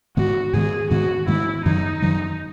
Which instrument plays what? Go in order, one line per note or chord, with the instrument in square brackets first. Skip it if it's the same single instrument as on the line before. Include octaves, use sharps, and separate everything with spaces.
[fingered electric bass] G#2 D#3 G#3 B3 [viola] F#4
[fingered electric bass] G#2 D#3 G#3 B3 [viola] G#4
[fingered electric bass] G#2 D#3 G#3 B3 [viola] F#4
[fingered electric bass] G#2 D#3 G#3 B3 [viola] E4
[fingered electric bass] F#2 D#3 F#3 [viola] D#4
[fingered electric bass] F#2 D#3 F#3